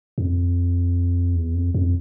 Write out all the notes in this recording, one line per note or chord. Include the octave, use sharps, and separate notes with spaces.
F2
E2
F2
F2